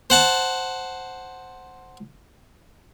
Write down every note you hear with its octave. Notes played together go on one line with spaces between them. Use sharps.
C5 F#5 A5